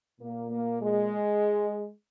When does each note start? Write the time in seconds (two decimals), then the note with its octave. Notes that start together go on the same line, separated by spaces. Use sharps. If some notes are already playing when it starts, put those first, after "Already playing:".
0.20 A#2 A#3
0.50 A#3
0.81 G#3